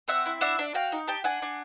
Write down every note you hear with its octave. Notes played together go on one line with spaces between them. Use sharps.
C4 E5 F#5
E4
D4 E5 F#5
D4
F#4 F5 G5
D#4
G4 G5 A5
D4 F#5 G#5
D4